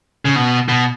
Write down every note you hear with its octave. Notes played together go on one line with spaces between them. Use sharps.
C#3
B2
B2